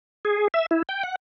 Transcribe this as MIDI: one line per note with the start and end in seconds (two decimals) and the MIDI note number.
0.25 0.48 68
0.54 0.66 76
0.71 0.82 64
0.89 1.03 79
1.03 1.15 78